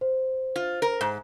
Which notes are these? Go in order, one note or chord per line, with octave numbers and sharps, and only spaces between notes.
C5
F4
A#4
G#2